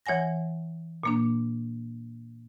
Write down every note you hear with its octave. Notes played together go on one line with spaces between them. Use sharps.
E3 C#5 F#5 G#5 A#6
A#2 A#3 D4